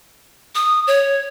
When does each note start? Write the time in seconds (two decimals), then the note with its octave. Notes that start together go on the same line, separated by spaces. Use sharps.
0.55 D#6
0.87 C#5